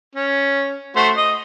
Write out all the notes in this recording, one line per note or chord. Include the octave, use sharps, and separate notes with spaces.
C#4
A3 F#4 C5
D#5